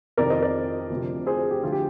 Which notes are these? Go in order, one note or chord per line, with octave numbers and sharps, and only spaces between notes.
F2 C3 D#3 A#4 D5
C5 D#5
A#4 D5
D2 C3 F3
G#4 C5
G4
D2 D3 F3 F4
G4